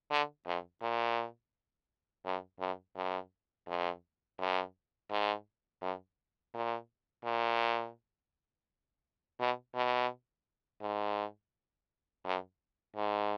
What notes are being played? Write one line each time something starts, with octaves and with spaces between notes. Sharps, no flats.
D3
F2
A#2
F#2
F#2
F#2
F2
F#2
G#2
F#2
A#2
A#2
B2
B2
G#2
F#2
G#2